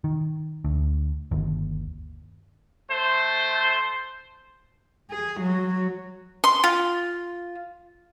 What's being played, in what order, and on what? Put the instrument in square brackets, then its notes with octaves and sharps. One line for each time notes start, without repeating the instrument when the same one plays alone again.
[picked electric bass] D#3
D2
G1 D#2
[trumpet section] A3 C5
[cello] G#4
F#3
[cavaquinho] C6
F4